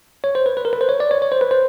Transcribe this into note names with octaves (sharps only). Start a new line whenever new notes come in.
C#5
C5
B4
B4
A#4
B4
C5
C#5
D5
C#5
C#5
C5
B4
C5